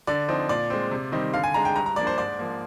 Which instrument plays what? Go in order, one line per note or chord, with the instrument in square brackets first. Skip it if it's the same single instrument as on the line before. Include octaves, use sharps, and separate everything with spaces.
[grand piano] D3 D5
F3 C4 D#4
A#2 D5
G#3 C4
C3
D#3 G3 C4 D#4
D3 F5
G#5
G#3 D4 A#5
G5
G2 A#5
A#5
F3 A#3 D4 D5
C5
G#2 D5
F3 A#3